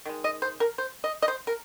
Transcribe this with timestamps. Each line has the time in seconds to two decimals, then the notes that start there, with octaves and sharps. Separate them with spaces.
0.06 D#3 G#3
0.24 D#5
0.42 C5
0.60 A#4
0.78 C5
1.04 D#5
1.22 D#5
1.28 C5
1.47 A#4